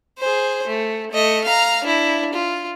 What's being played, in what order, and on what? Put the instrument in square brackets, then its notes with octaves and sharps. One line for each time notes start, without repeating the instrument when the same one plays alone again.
[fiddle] G#4 C5
A3
A3 D#5
F5 A#5
D4 E4
F4